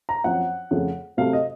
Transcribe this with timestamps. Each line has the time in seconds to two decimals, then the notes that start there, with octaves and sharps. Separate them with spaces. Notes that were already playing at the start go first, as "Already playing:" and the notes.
0.09 A#5
0.24 F#2 F3 C4 F#5
0.71 F2 C#3 A3 C4
1.17 C3 F#3 A3 C4 F5
1.33 D#5